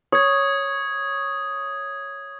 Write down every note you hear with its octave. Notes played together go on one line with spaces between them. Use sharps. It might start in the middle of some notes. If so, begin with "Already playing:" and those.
C#5 D#6 G#6